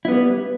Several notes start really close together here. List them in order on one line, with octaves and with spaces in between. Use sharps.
E4 B3 G3 B4